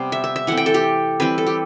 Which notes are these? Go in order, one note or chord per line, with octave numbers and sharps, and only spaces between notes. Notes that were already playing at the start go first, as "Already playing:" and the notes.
Already playing: C3 G3 B3 C5
E5
E5
E5
E3 A3 C4 F#5
G5
A4
G4
E3 G3 C4 B4
A4
G4